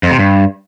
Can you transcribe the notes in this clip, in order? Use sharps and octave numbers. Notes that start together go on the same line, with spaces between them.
F2
C3
G2